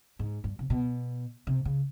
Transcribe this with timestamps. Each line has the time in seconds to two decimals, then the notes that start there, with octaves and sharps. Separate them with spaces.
0.19 G#2
0.44 G2
0.59 C3
0.70 B2
1.47 C3
1.65 C#3